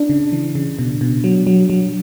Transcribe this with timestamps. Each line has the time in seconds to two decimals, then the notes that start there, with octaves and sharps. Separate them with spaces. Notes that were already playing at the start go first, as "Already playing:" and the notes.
Already playing: D4
0.09 C#3
0.32 E3
0.55 C#3
0.79 B2
1.01 B2
1.24 F#3
1.47 F#3
1.70 F#3